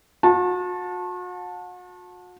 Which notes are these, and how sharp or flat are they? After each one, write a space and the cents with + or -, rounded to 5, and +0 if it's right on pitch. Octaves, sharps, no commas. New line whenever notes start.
F#4 -40 A5 +0